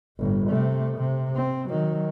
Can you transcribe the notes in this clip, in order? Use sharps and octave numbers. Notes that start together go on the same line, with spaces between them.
G1 A2
C3 A3
C3
C4
D#3 F#3